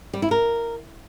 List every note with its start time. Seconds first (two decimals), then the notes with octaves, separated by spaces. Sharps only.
0.13 G3
0.22 E4
0.31 A#4